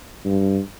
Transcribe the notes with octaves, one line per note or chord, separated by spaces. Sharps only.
G2